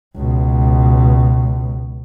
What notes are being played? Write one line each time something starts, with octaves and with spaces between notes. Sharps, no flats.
C#2 B2